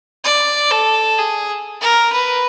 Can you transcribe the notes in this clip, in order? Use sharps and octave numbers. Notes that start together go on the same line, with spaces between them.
D5
A4
G#4
A#4
B4